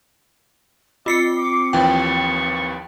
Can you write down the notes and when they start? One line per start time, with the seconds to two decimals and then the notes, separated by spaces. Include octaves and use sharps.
1.06 C4 F4 D5 C7 C#7
1.38 D6
1.73 D#2 E3 F3 G5 C#6